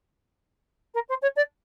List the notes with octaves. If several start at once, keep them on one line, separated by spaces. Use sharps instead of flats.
A#4
C5
C#5
D5